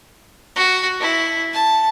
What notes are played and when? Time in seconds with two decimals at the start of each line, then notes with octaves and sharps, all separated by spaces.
0.56 F#4
1.00 E4
1.53 A5